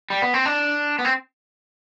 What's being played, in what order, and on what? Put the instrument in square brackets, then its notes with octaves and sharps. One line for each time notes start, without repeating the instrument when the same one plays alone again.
[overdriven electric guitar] G3
B3
C4
D4
B3
C4